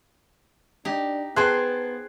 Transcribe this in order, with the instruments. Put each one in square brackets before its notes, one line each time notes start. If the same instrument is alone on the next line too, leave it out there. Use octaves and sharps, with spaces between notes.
[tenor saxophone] D4 [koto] D#4 G4
[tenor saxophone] B3 [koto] G#4 C5 G5 [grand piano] A5 C6 F#6